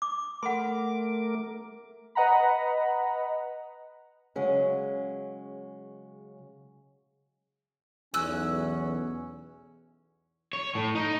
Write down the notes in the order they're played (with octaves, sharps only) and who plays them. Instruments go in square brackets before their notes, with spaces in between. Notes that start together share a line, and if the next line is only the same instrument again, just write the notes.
[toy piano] D6
[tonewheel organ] A3 A#4 D6 [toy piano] F#5 B5 C6
[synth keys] B4 D#5 F#5 A#5 B5
[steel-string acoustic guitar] C#3 F#3 G#3 C#4
[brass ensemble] B1 E2 [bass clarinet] C#4 [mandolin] E6 F#6
[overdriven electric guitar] C#5
A2
D#4